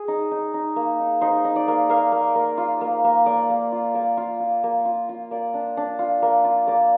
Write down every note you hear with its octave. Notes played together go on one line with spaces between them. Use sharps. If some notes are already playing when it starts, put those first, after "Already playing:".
Already playing: G#4
D#4
D#4
D#4
A#3
D#4
D#4 C5
D#4
D5
A#3
A#3 F5
A#3
A#3
F4
A#3
A#3
A#3 D5
A#3
F4
A#3 D5
F4
F4
A#3
F4
F4
A#3 D5
D4
D4
F4
A#3
F4
A#3 D5